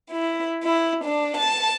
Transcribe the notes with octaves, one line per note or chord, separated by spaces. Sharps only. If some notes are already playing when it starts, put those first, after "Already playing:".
E4
E4
D4
A5